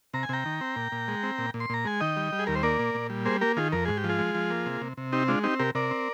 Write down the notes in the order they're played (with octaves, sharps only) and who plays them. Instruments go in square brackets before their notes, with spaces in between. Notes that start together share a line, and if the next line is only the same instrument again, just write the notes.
[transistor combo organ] C3 A#5
G#5
C3 G5 A#5
D#3
C4
A#2
A#2
G#3
C4
A#2
A#2
C6
A#2 A#5
G#3 G#5
D#3 D#5 G5
G3
G3
G#4
D#2 A#4
C5
A#3 A#4 D5
A#2
A#2
G3
A#3 G#4 C5
A#3 G4 A#4
D#3 F4 G#4
F2 A#4
G#2 G#4
G4
F3
F4 G#4
G#3
F3
A#3
C3
C3
C3
C4 D#4 G4
G#3 D4 F4
C4 D#4 G4
C3 G4 A#4
C3 A#4 D5
C4